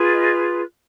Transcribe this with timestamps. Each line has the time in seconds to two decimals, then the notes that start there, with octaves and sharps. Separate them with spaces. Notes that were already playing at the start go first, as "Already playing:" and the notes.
Already playing: F4 G#4 B4
0.11 D#5